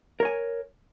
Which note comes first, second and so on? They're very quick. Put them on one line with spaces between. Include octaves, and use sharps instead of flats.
A#4 C#5 G#5